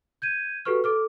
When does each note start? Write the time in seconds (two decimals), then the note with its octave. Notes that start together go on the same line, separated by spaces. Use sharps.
0.22 G6 G#6 D#7
0.65 F#4 G4 A4 B4 C#6 F6
0.84 A4 D6 F6